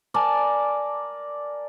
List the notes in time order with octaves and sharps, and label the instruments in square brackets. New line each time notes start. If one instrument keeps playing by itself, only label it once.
[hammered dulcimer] A#4 D5 G#5 A5